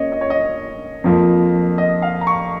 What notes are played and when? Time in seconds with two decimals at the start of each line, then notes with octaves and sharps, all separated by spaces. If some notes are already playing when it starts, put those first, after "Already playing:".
Already playing: C#3 A#3 C#4 C#5 D#5
0.12 D#5
0.21 C#5
0.30 D#5
1.04 F2 F3 A#3
1.78 D#5
2.02 F5
2.21 A#5
2.27 C#6